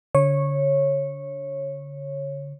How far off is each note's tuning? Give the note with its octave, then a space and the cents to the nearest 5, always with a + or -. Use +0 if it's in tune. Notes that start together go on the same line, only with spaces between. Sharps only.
D3 -35 C#5 -15